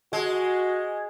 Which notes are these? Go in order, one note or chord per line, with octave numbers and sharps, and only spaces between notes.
G#3 F#4